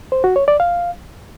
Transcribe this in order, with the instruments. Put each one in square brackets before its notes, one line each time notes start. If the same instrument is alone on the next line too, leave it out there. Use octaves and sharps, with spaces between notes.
[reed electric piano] C5
F#4
C#5
D5
F5